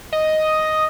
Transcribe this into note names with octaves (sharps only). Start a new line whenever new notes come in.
D#5